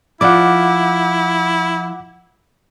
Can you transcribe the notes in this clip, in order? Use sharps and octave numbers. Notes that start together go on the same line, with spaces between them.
F3 E4 D5 F#5 D6